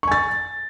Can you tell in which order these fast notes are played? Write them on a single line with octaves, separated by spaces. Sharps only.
C#6 G#5 A6